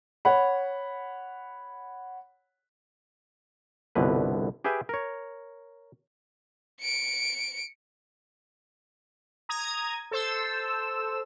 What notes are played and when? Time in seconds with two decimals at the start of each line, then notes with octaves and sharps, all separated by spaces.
0.25 C#5 F#5 B5
3.95 G1 C2 B2 D3 B4
4.64 G4 G#4 B4 E5 G5 G#5
4.89 A#4 C#5
6.81 C#7 D7
9.49 A#5 D#6 G#6
10.11 A4 C5 E6